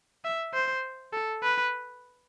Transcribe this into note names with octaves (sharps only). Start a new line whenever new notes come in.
E5
C5
A4
B4